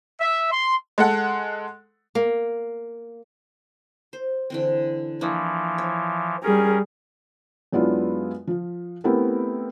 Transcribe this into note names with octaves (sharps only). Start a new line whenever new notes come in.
E5
C6
G#3 A4 F#5
A#3
C5
D3 E3 C4
E3 F3 A#3 D4 E4
C#5
G3 C#4 G#4 A#4
F#2 G#3 B3 D4 E4 F4
F3 F4
A3 B3 C4 E4 G4 A#4